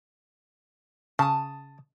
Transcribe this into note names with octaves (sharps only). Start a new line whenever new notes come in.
C#3 A5 D#6